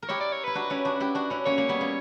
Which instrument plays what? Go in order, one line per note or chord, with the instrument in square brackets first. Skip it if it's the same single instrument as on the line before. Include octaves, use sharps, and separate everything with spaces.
[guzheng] A#4
[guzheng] E4 G4 [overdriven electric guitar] C#5
[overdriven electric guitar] D5
C#5
[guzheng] E4 [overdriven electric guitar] B4
[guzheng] D4 F#4
C#4 E4
D4 F#4
E4 G4
D4 F#4
C#4 E4
[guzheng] A#3 C#4 [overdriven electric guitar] C#5
[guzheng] A#3
G3 B3
A#3